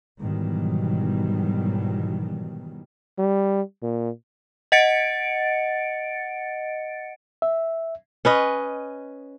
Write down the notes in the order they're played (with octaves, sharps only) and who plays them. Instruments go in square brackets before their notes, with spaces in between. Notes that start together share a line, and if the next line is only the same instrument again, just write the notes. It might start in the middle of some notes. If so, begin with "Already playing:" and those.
[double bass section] G#2 B2 D#3 E3 F#3 G3
[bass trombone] G3
A#2
[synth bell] D#5 F#5 A6 C#7 D7
[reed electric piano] E5
[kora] C#4 B4 D#5